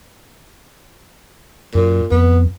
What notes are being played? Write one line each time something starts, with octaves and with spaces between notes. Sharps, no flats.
F#2 A#2
F2 B3